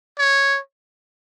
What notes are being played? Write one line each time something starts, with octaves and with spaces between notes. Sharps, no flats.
C#5